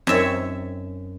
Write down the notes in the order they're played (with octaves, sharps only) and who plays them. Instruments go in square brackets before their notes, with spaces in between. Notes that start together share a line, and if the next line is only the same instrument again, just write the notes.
[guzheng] F#2 E5 [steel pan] C4 D#4 C#5